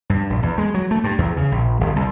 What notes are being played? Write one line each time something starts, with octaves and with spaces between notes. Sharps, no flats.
G2
A#1
E2
G#3
F#3
A3
G2
E2
C#3
A#1
G1
C2